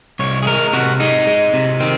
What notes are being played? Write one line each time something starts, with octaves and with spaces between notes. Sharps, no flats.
C2 C#5
G#4
G#3 A#4
C3 F#4
G#3 D#4
G#3
C3
D#3 C4